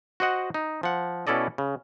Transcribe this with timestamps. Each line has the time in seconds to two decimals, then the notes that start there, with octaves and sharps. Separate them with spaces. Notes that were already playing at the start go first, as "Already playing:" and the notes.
0.20 F#4 C5 D#5 F#5
0.54 D#4
0.83 F3 F#5
1.27 B2 C#4 E4 A4 D5 D#5
1.58 C#3